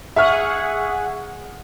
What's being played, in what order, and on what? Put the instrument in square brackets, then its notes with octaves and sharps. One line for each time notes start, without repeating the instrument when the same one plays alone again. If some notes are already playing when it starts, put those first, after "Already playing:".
[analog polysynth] G#4 F#5 [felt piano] E5 C#6 F6